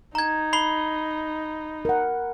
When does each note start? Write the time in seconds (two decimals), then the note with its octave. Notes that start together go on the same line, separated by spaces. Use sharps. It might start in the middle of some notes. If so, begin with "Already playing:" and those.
0.15 D#4 A#5 G#6
0.53 B5 C7 G7
1.85 A#4 F#5